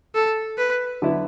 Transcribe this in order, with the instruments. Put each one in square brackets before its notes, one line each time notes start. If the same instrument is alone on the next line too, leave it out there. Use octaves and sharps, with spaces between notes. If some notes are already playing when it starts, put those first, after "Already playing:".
[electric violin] A4
B4
[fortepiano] D3 F#3 B3 E4